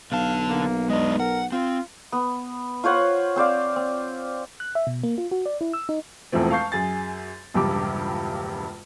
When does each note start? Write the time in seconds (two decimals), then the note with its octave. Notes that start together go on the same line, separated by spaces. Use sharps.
0.12 B1 D3 F5 A5
0.49 A#3
0.90 G#3 D4 D#5
1.20 A#4 F#5
1.52 C4 F4
2.12 B3
2.84 F4 C5 C#5 F#5
3.36 C4 C5 D5 F5
3.76 C4
4.60 F#6
4.75 E5
4.87 B2
5.04 A#3
5.18 F4
5.31 F#4
5.46 D5
5.61 E4
5.73 E6
5.89 D#4
6.32 E1 E2 F3 A3 C4
6.51 F5 A5 C#6 G6 C7
6.72 F#2 G#4 A6
7.54 E1 A#1 G2 C#3 G4 D6